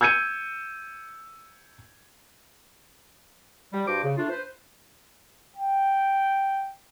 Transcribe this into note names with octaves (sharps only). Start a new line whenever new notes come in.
E6 G6 G#6 C#7 D#7
G3
G2 F#4 C5 D6
C#3
A3 D4 F4
B4 C5
G5